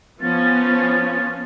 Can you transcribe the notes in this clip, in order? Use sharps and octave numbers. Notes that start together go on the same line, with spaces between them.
F3 B3 C#4 A6